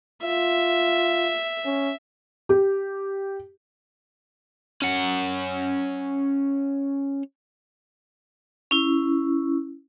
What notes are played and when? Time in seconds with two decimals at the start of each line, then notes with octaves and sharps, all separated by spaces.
0.24 F4 E5
1.65 C#4
2.49 G4
4.82 C#4 F#5
8.71 C#4 E4